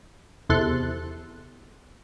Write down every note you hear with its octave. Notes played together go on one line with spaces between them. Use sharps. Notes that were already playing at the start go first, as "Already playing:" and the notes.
E2 C3 A4 C6 F#6